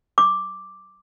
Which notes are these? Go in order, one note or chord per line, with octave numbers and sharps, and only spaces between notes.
D6